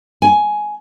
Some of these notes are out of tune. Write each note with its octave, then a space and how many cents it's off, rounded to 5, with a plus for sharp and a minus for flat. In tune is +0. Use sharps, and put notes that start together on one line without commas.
G#5 +10